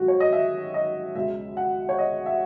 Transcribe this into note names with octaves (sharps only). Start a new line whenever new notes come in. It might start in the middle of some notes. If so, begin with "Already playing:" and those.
Already playing: F#2 D#3 G#3 F#4
C#5
D#5
E5
D#5
C#2 B2 G#3 E5
F#5
C#5
D#5
E5